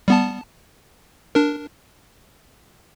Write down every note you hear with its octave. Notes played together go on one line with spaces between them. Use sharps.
G3 B3 A5
D4 A#4